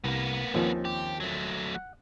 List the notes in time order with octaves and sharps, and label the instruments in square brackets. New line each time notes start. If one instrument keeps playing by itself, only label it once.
[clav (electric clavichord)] C2 [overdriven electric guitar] A#3 B3
[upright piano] D#2 F3 [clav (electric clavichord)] D#3 C4 C#4
[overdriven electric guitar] G4
F#3 A3
[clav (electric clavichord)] F#5